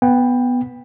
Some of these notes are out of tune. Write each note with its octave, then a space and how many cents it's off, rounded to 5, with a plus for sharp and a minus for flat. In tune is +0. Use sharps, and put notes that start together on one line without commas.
B3 +0 G5 +20